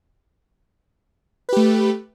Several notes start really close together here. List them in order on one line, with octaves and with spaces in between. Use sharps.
B4 G4 A3